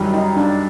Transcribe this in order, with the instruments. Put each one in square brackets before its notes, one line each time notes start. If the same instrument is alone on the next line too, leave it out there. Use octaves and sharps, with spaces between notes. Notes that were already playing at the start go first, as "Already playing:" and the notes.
Already playing: [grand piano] F#2 D#3 G3
[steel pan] D#4
D4